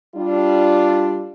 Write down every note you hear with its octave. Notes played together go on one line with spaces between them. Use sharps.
G3 D4 F4